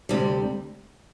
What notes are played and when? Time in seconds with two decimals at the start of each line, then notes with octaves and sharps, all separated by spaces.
0.09 D2 C3 G3